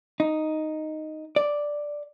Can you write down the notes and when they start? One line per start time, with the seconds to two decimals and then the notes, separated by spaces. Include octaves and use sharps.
0.20 D#4
1.36 D5